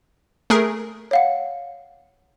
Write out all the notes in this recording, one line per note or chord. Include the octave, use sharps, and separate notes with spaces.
A3 G#4 A#4
C#5 F5 F#5